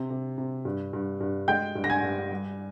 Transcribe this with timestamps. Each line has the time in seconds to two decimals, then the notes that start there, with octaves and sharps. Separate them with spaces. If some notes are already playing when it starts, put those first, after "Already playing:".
Already playing: C3
0.10 C3
0.38 C3
0.65 G2
0.93 G2
1.21 G2
1.48 G#3 G5 G6
1.75 G2
1.84 A#6
1.90 G#5 G#6
2.03 G2
2.31 G3